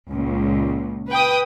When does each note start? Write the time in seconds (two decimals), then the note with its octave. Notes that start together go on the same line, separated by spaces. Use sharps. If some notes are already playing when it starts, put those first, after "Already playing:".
0.11 C#2 A#2
1.10 B4 G5 D#6